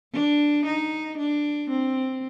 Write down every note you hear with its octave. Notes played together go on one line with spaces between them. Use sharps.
D4
D#4
D4
C4